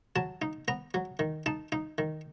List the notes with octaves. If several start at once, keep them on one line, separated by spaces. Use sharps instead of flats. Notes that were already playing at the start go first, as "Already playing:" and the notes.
F#3 A5
D#4
B3 A#5
F#3
D#3
D#4 A5
D#4
D#3